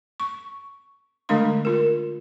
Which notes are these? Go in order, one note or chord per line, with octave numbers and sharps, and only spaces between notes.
C#6
D3 G#3 A3 D4 F5 C6
F4 A#4